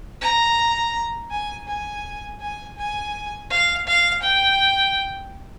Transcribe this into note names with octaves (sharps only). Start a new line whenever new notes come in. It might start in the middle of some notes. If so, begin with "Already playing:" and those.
A#5
G#5
G#5
G#5
G#5
F5
F5
G5